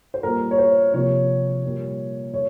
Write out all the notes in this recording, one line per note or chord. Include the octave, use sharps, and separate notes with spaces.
C5
A#2 G3 A#3 A#4
C#5
C5
C3 F3 A#3 C#5
A#2 G3 A#3
A#2 C#5